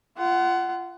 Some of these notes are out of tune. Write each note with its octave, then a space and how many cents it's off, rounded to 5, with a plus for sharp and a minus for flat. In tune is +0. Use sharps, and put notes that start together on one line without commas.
F4 -20 F#5 +20